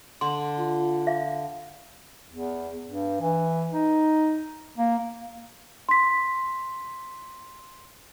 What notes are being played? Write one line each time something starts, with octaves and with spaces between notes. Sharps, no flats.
D3 C6
F4
E5 F5
E2
G2
E3
D#4
A#3
C6 B6